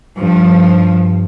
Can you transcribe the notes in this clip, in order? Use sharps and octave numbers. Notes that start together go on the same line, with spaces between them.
G2 F3